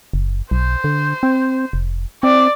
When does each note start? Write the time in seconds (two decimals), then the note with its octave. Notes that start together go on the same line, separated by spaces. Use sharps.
0.13 F#1
0.51 B1 C5
0.84 D3
1.23 C4
1.73 F1
2.23 C4 D5